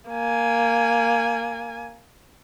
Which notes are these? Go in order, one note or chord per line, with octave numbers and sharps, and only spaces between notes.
A#3 G#5